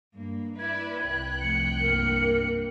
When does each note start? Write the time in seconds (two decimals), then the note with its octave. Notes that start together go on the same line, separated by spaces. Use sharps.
0.14 G2 A#3
0.59 E4 B4 D5 G#6
1.02 C2 G5 F#6
1.40 F2 A3 C#7
1.80 G2 A#3 A#4